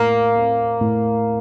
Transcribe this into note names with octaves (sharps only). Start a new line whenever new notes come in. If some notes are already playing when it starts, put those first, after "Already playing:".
Already playing: A2 A3 A#3
A3 C4
A2